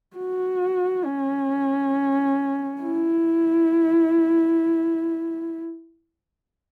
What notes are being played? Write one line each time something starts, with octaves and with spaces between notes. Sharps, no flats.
F#4
C#4
E4